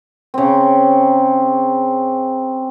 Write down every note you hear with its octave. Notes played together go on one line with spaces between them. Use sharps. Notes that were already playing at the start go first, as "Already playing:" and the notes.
C#3 C4